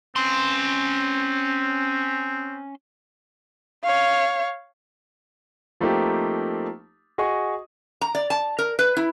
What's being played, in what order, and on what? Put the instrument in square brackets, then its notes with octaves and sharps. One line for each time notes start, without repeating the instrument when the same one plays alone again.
[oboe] C4 [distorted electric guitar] C#4 C6
[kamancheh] C#5 F5
[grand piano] F3 A3 A#3 C4 D#4 G4
F#4 G#4 D#5 C#6
[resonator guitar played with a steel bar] A#5
D5
A5
A#4
B4
E4